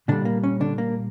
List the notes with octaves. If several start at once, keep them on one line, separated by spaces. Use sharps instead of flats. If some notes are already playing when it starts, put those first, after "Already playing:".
A#2 D3 G3 D4
A#3
C#4
D3 D4
A#3